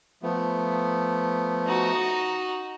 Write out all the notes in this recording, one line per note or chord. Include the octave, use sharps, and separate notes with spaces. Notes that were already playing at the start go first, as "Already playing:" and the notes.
F3 A3 B3
D#4 F#4